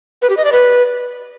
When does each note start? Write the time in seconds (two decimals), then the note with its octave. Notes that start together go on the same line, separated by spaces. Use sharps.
0.22 B4
0.30 G4
0.37 D#5
0.45 D5
0.52 B4